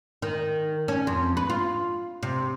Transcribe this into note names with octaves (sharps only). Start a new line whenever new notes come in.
D#3
C#4
F2
B4
F4
C3